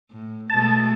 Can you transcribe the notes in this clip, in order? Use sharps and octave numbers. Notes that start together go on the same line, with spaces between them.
A2
B2 G#3 A3 A5